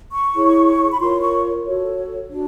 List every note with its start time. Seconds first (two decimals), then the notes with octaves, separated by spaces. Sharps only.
0.12 C#6
0.34 E4 G#4 C#5
0.92 B5
1.00 F4 A#4 C#5 C6
1.22 C#6
1.65 F#4 A4 C#5
2.31 D4 F#4